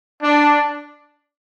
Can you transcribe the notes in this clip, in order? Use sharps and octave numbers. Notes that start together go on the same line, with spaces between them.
D4